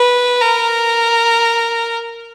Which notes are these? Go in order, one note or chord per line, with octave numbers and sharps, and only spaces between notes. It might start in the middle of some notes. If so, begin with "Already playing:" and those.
Already playing: B4
A#4